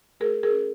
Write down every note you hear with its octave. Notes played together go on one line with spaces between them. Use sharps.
A3 G#4 A#4
G#4 A#4
C#4